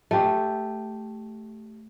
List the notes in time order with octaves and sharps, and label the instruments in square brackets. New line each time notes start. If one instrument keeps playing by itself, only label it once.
[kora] A3 G4